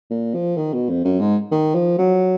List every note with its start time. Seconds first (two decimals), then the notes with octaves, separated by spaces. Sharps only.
0.10 A#2
0.34 F3
0.57 D#3
0.73 B2
0.89 F2
1.05 F#2
1.20 G#2
1.52 D#3
1.74 F3
1.99 F#3